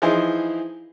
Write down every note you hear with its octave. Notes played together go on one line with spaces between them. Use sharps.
E3 F3 D#4 E4 G#4 C5